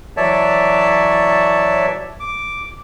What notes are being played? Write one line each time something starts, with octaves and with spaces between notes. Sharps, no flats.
E3 F#3 C#5 D5 E5 A5
D6